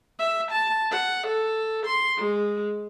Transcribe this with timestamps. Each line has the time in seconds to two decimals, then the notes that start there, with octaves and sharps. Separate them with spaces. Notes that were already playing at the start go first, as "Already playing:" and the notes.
0.19 E5
0.51 A5
0.91 F#5
1.27 A4
1.86 C6
2.17 G#3